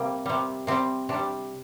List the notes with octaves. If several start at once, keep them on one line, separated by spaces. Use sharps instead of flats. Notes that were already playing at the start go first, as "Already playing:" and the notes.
Already playing: C3 G3 A#3
C3 G3
C3 G3 C4
C3 D4
G3